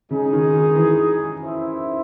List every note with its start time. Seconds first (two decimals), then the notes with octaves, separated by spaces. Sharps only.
0.10 C#3 G#3 D#4 G#4
0.33 D#3
0.53 D#3
0.75 E3
1.41 E4 C5 E5